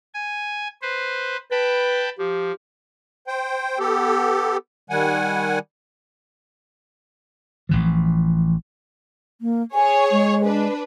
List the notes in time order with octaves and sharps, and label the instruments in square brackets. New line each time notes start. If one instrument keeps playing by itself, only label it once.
[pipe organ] G#5
B4 C5
[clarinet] B4 [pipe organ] G5 A5 B5
[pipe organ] F3 [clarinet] G4
[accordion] C5 G5
B3 G4 A4
D#3 G3 F#5 G#5
[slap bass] A1 E3 F3
[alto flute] A#3
[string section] G#4 C#5 [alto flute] G#5
[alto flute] G#3
[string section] D4 B4